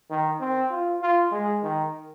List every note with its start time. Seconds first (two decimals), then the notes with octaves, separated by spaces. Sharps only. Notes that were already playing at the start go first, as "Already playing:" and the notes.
0.10 D#3
0.40 C4
0.71 F4
1.02 F4
1.32 G#3
1.63 D#3